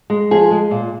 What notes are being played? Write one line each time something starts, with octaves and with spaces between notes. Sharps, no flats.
G#3
F3 G#4
G#3
A#2